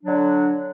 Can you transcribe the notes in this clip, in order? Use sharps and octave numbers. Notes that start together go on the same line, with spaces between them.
D3 F#3 D4